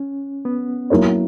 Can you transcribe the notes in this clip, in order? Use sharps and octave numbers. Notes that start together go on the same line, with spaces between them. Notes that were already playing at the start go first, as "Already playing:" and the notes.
Already playing: C#4
B3
F#3 A#3 E4 A#4 C#5